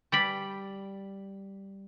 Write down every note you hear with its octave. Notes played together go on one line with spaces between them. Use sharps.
G3 D5 B5